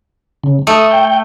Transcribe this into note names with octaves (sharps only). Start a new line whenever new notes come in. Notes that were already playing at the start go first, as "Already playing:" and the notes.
C#3
A3 D#6
G5